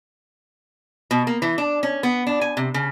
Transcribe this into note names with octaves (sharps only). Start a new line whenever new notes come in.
B2
A#3
E3
D4
C#4
B3
D4
G#5
C3
C#3